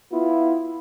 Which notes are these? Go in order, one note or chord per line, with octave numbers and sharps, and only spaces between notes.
B3 E4 F4